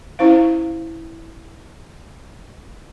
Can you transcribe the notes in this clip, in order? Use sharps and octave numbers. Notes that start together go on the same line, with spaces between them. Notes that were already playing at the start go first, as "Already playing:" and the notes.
C#4 E4 C5 F5